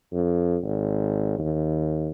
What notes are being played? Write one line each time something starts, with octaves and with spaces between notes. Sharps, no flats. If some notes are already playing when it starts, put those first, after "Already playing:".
F2
G#1
D#2